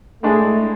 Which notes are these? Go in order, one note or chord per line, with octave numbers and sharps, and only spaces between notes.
A2 G#3 A3 D4 G#4